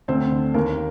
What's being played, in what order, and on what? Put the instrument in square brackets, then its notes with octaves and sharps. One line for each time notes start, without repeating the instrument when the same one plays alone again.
[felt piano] D2 C4 C5
D3
D#2 A#3 A#4